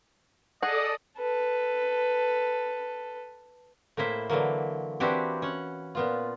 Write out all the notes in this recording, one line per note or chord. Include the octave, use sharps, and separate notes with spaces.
G#4 A4 D5 D#5 F#5 D#6
A4 B4
A2 A#3 E4 C5 E5
D3 E3 F#3 A#3
E3 C4 D4 E4 F#4 G4
C#4 F#5
A#2 B3 F4